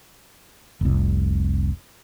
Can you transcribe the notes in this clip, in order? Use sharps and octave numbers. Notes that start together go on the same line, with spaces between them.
F1 C2